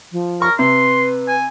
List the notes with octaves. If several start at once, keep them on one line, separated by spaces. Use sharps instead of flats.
F3
A#4 C#6
C3 B4 C6
G#5